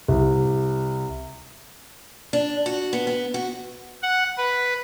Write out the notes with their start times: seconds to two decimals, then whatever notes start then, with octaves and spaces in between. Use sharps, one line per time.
0.08 C2
2.33 D4
2.66 F#4
2.93 B3
3.07 B3
3.34 F#4
4.03 F#5
4.38 B4